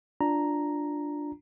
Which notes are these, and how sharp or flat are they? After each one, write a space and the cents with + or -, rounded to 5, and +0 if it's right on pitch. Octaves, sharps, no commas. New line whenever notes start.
D4 +0 F4 +0 A#5 +0